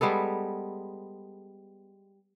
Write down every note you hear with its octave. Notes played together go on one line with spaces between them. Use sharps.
G3 G#3 B3 A4